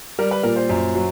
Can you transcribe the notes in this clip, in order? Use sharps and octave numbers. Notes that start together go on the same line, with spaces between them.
G3 A#4
B4
A#2 A#4
C5
F#2
F#3